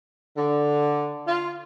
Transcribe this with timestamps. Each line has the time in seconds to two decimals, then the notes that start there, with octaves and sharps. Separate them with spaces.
0.37 D3
1.26 F4